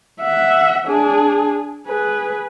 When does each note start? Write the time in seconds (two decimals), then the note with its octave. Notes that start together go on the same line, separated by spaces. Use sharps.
0.21 E5 F#5
0.87 D4 G#4
1.87 G#4 B4